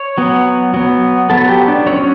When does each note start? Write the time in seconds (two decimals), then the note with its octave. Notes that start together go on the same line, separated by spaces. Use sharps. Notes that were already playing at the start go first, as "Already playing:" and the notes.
Already playing: C#5
0.18 F#3 B3
0.74 F#3 B3
1.30 F#3 B3 A4
1.49 G4
1.68 D4
1.87 F#3 C#4 C#5